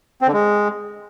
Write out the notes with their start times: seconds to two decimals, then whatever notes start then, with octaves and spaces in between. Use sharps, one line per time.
0.22 C4
0.27 D3
0.33 G#3